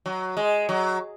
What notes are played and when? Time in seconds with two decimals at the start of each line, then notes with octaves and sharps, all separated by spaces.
0.06 F#3
0.37 G#3
0.69 F#3